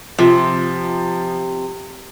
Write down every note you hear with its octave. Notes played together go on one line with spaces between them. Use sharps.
C3 F3